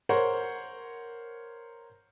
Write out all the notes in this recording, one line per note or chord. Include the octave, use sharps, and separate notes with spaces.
A#4 C5 C#5 F#5